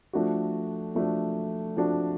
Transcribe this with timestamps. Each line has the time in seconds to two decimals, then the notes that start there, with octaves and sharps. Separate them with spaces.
0.13 F3 A3 D4 F#4
0.95 F3 A3 D4 F#4
1.77 F3 A3 D4 F#4